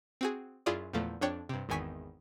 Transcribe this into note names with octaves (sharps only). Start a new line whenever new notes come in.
C4 F#4 G#4
F#2 E4 F4 G#4 D5
E2 A#2 F3 A3
F2 D4 C#5 G5
G2 C3
G#1 E2 D#3 G#5 C#6 B6